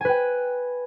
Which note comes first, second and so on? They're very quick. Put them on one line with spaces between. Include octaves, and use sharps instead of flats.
G#5 B4 G5